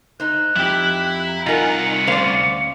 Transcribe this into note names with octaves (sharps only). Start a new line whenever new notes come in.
D#4 C5 F#6
F2 E4 G4
A#5
C2 D#4 F4 A#4 F#5 G#5
C#7
D2 C#4 C5 D5 F5